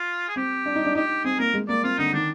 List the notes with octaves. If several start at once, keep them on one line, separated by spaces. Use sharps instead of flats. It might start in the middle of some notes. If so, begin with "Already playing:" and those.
Already playing: F4
G#4
C4 G4
D4
D#4
D4
D#4 G4
C4 G#4
A#3 A#4
G#3
A#3 D5
C4 F4
D3 D#4
D#3 D4